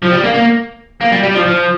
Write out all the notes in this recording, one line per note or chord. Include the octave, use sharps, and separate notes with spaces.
F3
G3
A#3
A#3
A#3
G3
G3
F3
F3